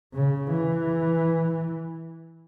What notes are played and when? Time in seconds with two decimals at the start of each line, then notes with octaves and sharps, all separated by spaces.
0.14 C#3
0.51 E3